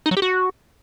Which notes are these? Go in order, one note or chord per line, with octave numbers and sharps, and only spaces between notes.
D#4
F#3
G4
F#4